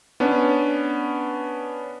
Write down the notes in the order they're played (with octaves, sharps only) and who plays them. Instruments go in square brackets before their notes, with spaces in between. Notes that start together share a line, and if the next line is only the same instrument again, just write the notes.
[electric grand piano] B3 C#4 D4